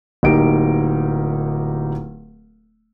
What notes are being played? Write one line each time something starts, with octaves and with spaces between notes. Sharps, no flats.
D1 A#3 D#4 G4 D7